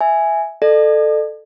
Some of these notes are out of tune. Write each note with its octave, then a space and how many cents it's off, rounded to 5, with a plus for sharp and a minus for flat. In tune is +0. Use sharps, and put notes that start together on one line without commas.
E5 +0 G#5 +0
A4 +0 D5 +45